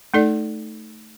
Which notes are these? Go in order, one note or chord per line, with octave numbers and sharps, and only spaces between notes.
A3 D#4 A4 D5